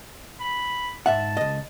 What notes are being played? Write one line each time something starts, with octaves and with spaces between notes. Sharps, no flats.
B5
G#2 E5 F#5 A5
C#2 D#5